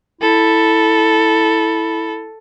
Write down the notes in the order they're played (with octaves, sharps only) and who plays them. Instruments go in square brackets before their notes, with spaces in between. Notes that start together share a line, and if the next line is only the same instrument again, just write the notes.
[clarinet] E4 [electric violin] A4